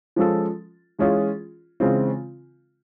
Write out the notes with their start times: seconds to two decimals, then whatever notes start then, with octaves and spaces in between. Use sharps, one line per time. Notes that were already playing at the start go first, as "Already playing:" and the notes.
0.16 F3 G#3 C#4 F4 A4
0.99 E3 G#3 C#4 F4 G#4
1.80 C#3 E3 G#3 C4 F4